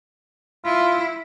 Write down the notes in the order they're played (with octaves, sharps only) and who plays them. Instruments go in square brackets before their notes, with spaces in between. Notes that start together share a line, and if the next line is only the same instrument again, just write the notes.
[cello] E4 [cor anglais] F4